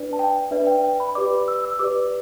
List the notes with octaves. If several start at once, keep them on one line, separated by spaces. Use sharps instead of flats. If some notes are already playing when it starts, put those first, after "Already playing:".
Already playing: D4 B4 D5
A5
G5
D4 B4 D5 E5
G5
G5
B5
G4 B4 D5 D6
E6
E6
G4 B4 D5 D6